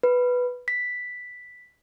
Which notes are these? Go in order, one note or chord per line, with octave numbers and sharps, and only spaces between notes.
B4
B6